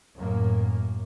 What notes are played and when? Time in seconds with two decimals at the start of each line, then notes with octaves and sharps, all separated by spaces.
0.17 F#2 A2 A#3